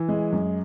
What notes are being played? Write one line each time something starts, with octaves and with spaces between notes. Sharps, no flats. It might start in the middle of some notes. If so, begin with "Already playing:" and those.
Already playing: E3
G#3
F#2